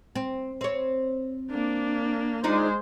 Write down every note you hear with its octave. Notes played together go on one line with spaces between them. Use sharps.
C4
C4 C#5
A#3 D4
G#3 D4 D#4 F4 C5